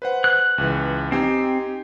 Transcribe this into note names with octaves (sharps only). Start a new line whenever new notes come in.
B4 C5 F#5
F#6
C#2 E3
C4 D#4 G4 G#5